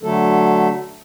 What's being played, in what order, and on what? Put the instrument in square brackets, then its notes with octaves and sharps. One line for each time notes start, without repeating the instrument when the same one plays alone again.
[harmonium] D3 F#3 A3 A4